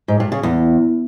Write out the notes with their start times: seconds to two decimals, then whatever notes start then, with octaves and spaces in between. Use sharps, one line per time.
0.08 G#2
0.20 G2
0.32 C#3
0.43 E2